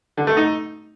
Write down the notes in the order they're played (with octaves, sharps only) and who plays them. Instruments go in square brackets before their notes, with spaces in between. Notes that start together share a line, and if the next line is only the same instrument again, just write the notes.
[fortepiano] D3
A3
D#4